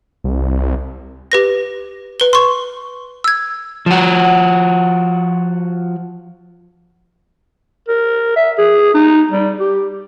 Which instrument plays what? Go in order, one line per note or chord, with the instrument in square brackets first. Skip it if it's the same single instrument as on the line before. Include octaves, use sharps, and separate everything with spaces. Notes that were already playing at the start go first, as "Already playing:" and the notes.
[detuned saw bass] C2
[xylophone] G4 B4 A#6
B4 G7
C6 C#6
E6 G#6
[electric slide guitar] F3 F#4
[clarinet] A#4
E5
G#4
D#4
G3
G4